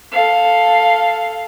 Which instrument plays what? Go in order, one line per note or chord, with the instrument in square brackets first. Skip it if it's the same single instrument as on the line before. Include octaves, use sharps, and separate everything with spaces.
[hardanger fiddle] A4 F5